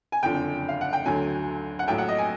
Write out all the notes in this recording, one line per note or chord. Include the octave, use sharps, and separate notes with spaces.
G#5
F#1 F2 D3 F3 G5
F5
F#5
G5
D2 D3 F#3 G#5
F#5
A#1 A2 F#3 G5
F#5
D#5
G#5